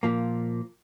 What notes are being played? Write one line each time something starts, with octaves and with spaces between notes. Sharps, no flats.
A#2 F3 A#3